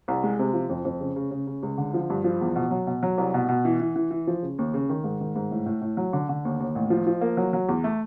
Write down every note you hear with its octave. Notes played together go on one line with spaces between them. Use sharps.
C2
G#3
C3
F3
F2
F2
C#3
C#3
C#3
C#3
C#2
D3
F3
G2
F3
E2
B2
F#3
B2
F#3
C2
B2
B2
E3
E3
E3
E3
F3
C#3
D#2
C#3
D#3
G#2
D#3
G#2
A2
A2
A2
F#3
D3
D3
D#2
D#2
A1
F3
F3
A#3
F#3
F#3
E2
A3